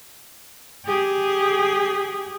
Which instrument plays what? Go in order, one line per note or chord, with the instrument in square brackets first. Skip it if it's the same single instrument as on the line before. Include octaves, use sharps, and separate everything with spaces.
[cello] G4 G#4